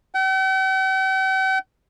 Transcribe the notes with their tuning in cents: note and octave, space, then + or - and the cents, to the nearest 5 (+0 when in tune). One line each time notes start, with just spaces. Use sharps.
G5 -45